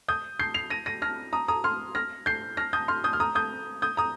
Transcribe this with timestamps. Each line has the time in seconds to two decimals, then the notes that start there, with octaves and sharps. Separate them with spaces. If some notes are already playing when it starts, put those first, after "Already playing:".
0.08 D#6 G6
0.39 G6 C7
0.54 C7 F7
0.70 A#6 D#7
0.86 A#6 D#7
1.02 F6 A#6
1.33 A#5 D#6
1.48 A#5 D#6
1.64 C6 F6
1.95 F6 A#6
2.26 G6 C7
2.57 F6 A#6
2.73 D#6 G6
2.88 C6 F6
3.04 D#6 G6
3.13 F6
3.20 A#5 D#6
3.35 D#6 G6
3.82 D#6 G6
3.97 A#5 D#6